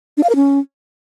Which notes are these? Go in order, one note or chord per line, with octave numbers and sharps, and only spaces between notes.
D4
F5
A#4
C#4